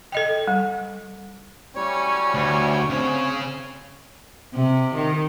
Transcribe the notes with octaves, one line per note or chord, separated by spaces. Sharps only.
A4 D#5 G5
G3
A2 F#3 G3 C#4 C#5
D2
C#3 C4 C#5
C3
D#3